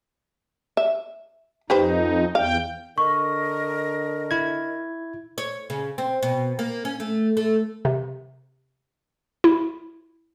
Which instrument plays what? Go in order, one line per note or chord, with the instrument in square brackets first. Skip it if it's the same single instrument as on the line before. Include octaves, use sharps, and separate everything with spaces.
[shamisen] E5
[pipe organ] F2 D#4 [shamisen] G4 B4 C5
[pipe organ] E2 G5 [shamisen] F5
[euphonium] D3 [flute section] A#4 D#5 [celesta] C#6
[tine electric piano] E4 G#6
[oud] C#5
C#3
C4
B2
A#3
C#4
A3
A3
[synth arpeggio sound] C3
E4